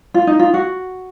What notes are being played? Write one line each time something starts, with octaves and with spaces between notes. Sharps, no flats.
F4
D#4
F4
F#4